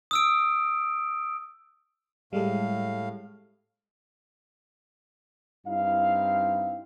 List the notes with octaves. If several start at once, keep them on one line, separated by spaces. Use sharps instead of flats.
D#6 E6 D7
A2 G3 G#3 A4 F5
G2 C4 D#4 E4 F5